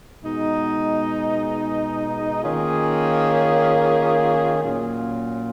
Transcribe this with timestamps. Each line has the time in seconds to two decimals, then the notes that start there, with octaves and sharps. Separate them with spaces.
0.22 B2 G#3 D#4
2.42 D#3 A#3 C#4 F4 G#4
4.62 A#2 F#3 A#3 C#4 F4